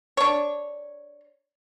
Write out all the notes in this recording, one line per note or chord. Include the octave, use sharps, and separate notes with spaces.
D4 C#5